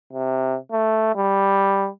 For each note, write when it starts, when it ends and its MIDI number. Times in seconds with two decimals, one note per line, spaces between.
0.13 0.57 48
0.72 1.14 57
1.15 1.89 55